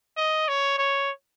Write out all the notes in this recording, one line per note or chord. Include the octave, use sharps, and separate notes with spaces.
D#5
C#5
C#5